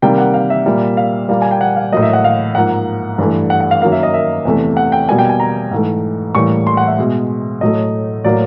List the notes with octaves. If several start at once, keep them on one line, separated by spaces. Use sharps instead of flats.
C3 D#3 G3 A#3 G5
F#5
F5
E5
A#2 G3 A#3
F5
A#2 G3 A#3
G#5
G5
F#5
F5
A2 F#3 A#3 D#5
E5
F#5
F5
G#2 F3 A#3 F#5
G2 E3 A3
F#5
F#5
F5
F#2 D#3 F#3 A#3 F5
E5
D#5
E5
E2 C3 E3 A3
F#5
G5
B2 G3 A#3 G#5
G5
G#5
A#5
G#2 E3 A3
A2 E3 G3 A#3 C#6
C6
F#5
E5
B2 G#3
A2 F#3 A3 D#5
A2 F#3 A#3 D5